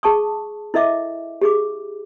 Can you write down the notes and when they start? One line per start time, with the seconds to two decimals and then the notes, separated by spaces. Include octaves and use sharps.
0.03 G#4 A5 C#6 D#6
0.74 E4 A4 D#5 E5 D6
1.41 G4 G#4 D6